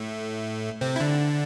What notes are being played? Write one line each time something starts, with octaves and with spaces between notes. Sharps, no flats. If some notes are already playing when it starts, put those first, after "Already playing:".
Already playing: A2 A3
C3 C4
E4
D3 D4